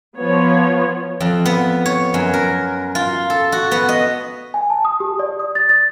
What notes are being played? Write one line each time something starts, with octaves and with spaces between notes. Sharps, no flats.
F3 B3 C#5
F2
B3
C#5
F#2
A#4
F4
A4
F#4
B3
D#5
G#5
A5
D#6
G4
D5
D#6
A6
A6